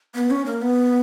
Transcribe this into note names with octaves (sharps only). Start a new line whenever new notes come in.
B3
C#4
A#3
B3